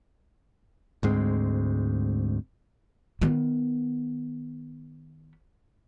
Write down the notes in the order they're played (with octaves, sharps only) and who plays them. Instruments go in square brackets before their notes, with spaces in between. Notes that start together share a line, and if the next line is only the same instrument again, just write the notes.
[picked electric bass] D2 G#2 G#3 C4
[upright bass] D#3 B3